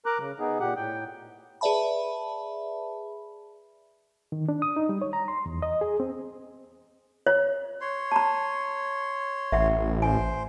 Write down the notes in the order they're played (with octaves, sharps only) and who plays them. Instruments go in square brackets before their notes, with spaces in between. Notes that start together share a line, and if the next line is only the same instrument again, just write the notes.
[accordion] A#4 A#5 D6 F#6
C#3
B3 D#4 G#4
A#2 G4 F#5
A2 G5
[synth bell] G#4 B4 D5 E5 A5 B5
[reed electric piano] D#3
D4
D#6
D#4
G3
C#5
A#5
C6
E2
D#5
G#4
C4
[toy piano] C#5
[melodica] C#5 C6
[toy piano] A5 A#5
[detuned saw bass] A1 [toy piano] E5 F#5
[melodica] C5 C6 [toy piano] G#5